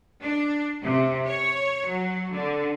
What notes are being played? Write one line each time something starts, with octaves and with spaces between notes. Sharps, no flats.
D4
C3
C#5
F#3
D3